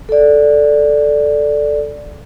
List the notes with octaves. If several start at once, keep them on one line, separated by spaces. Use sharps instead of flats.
A4 D5